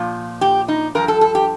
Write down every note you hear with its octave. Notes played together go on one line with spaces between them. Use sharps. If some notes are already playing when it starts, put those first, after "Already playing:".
Already playing: A#2 F3
G4
D#4
G2 F3 A#4
A4
A4
G4